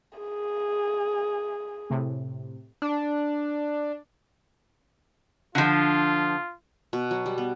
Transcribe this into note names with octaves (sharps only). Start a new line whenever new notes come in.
G#4
A2 C3
D4
D3 F3 F4
B2
F#3
G3
B3